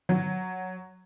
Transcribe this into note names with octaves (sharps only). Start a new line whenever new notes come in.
F#3